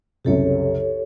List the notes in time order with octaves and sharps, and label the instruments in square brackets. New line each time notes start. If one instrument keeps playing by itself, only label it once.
[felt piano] C2 F#2 C#3 [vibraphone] G4 A4 C#5